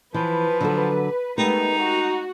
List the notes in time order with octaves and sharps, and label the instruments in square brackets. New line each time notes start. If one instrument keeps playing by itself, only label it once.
[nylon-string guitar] E3 [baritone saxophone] F3 [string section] B4
[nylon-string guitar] D3 F#3 A4
[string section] G#3 A3 B3 [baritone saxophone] D#4 [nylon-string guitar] G4 A#4
[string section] F#4